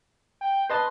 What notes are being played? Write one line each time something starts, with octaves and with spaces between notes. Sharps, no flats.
G5
B4 D#5 A5 C6